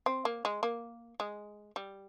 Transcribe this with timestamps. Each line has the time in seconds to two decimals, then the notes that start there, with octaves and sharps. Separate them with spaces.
0.06 C4
0.25 A#3
0.45 G#3
0.63 A#3
1.20 G#3
1.76 G3